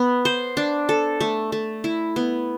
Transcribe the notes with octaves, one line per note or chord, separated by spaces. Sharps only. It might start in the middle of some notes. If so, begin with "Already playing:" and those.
Already playing: B3
C5
D4
A4
A3
A3
E4
B3